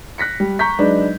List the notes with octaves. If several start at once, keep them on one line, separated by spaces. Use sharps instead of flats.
F#6 A#6 B6 C#7
G3
A#5 C#6 G6 B6
F#3 G#3 D4 D#4 B4